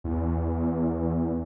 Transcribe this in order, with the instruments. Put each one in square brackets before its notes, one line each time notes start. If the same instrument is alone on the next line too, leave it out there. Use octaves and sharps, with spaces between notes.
[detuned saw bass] E2